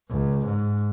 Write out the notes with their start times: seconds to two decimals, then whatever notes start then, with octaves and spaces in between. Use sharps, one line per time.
0.10 C#2
0.47 G#2